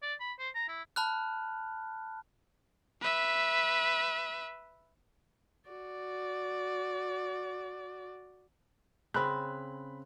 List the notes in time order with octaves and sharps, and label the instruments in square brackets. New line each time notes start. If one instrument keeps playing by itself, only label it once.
[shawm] D5
B5
C5
A#5
E4
[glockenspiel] A5 B5 F6 F#6
[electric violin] B4 E5
[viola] F#4 D5
[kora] C#3 C4 [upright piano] B5 F#6